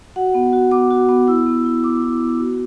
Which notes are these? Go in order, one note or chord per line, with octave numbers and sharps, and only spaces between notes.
F#4 F#5
B3
F#4
B3 D6
F#4
B3
E4 E6
B3
E4
B3 D6
E4
B3
F#4